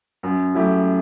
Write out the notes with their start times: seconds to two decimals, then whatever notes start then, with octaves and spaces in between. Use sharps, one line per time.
0.23 F#2
0.54 F#3 A3 E4 G4